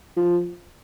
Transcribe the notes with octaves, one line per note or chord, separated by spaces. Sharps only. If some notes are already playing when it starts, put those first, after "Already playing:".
F3